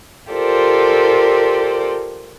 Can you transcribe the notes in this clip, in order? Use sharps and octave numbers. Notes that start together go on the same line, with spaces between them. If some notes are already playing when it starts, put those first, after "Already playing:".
F4 G4 A4 A#4 C5 D5